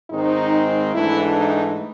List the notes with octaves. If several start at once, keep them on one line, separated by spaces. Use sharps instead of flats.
G#2 D#3 G#3 C4 D#4
G#2 E3 A3 D4 E4
D#4